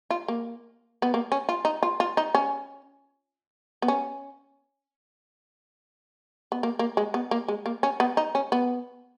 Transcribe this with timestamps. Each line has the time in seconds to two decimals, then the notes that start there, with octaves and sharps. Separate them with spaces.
0.10 F4
0.28 A#3
1.02 B3
1.14 A#3
1.32 C#4
1.49 F4
1.65 D#4
1.83 F4
2.00 F4
2.17 D#4
2.35 C#4
3.82 B3
3.88 C#4
6.52 B3
6.63 A#3
6.79 A#3
6.97 G#3
7.14 B3
7.31 A#3
7.48 G#3
7.66 A#3
7.83 C#4
8.00 B3
8.17 D#4
8.35 C#4
8.52 B3